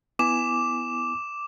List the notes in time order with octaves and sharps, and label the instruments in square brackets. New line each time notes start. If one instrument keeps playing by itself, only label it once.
[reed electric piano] B3 E4 G#5 [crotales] D6 E7